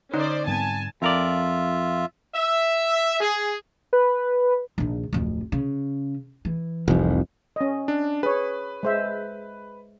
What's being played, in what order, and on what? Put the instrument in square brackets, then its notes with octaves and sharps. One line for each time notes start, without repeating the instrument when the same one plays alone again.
[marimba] D3 [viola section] C#4 C5 D5 [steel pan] D#4
[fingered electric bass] G#2 G3 C4 [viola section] B3 G#5 A5
[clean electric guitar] F2 A#4 D5 [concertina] F4 E5
[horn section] E5
G#4
[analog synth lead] B4
[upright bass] A#1 D#3
D1 F2
C#3
E3
[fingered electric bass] F1 C2 F2
[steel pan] C#4 D#5
[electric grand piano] D4
[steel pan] G#4 C#5 [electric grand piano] B4
[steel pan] G#3 C5 E5